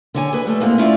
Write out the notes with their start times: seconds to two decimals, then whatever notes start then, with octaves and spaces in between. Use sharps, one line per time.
0.14 D3 C#5 G#5
0.33 G#4 B4 D#5
0.46 G3 A3 A4
0.60 G#2 G#3 A#3 C4 D#4 E4
0.78 A3 C#4 E4 F4 D5 F5